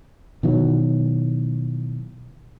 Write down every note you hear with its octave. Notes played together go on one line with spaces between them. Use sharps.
B2 D#3 E3 F#3